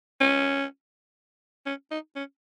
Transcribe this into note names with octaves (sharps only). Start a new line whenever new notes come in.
C#4
C#4
D#4
C#4